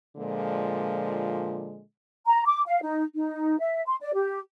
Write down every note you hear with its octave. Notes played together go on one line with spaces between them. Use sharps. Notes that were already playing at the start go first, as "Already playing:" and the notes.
A#2 D3 F3 G#3
A#5
D6
F5
D#4
D#4
E5
C6
D5
G4